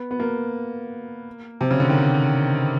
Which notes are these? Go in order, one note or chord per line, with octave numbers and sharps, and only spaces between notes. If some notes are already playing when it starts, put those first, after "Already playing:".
Already playing: B3
B3
A#3
C3
C#3
D3
D#3